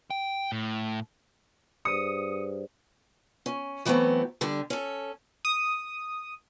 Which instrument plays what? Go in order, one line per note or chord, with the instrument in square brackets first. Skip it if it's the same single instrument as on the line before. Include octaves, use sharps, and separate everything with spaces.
[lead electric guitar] G5
A2
[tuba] G2 [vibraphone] G#4 C5 D5 [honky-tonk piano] D#6 [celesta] C#7 D#7
[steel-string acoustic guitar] C#4
E3 F#3 A3 B3 C4
D3 G3 D4
C#4 A4
[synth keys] D#6